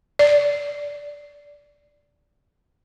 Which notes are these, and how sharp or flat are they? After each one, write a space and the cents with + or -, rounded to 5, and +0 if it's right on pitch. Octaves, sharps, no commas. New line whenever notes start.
D5 -10